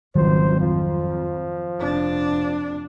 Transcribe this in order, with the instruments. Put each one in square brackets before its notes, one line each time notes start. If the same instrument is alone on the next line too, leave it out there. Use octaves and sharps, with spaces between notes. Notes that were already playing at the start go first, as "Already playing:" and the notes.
[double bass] G#1 C#2 [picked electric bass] D#3 F#3 G3 [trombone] C5
[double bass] F2 [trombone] F3
[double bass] F1 D4